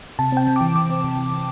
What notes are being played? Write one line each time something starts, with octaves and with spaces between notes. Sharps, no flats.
C3 A5
C4 G5
C3
E3 D6
C3 D6
C4
C3
E3
C3